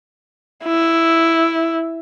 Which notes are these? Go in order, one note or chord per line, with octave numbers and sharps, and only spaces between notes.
E4